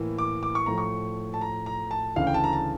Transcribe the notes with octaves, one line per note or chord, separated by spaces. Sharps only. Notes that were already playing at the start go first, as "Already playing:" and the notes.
Already playing: A2 E3 A#3
D6
D6
C#6
A2 F3 A3 A#5
C#6
A5
A#5
A#5
A5
D2 C#3 E3 F5
G5
A5
A#5
A5